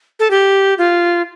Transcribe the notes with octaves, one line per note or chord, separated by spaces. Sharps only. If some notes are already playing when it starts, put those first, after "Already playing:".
A4
G4
F4